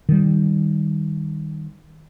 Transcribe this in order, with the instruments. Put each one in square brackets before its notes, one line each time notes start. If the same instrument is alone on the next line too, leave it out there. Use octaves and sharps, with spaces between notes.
[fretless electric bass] D#3 G3